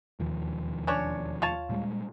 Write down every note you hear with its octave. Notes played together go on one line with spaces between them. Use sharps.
E1 D#2 D#3 F3
C#4 D4 C#5
F4 C#5 A5
A#2 G3 G#3